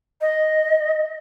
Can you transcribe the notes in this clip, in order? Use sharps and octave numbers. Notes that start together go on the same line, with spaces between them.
D#5